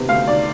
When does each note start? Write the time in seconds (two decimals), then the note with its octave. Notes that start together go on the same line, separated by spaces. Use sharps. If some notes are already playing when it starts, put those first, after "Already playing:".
Already playing: C3 D#3 B3
0.09 D2 F5
0.27 D#3 D5